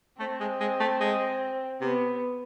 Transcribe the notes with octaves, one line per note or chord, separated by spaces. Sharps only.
A3 C4
G#3
G#3
A3
G#3
C3 B3